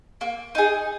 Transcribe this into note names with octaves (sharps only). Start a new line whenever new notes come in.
A#3
D#4 G#4